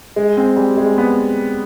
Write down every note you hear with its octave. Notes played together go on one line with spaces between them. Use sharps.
G#3
C4
G3
G#3
B3